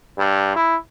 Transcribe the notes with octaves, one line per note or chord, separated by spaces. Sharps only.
G2
E4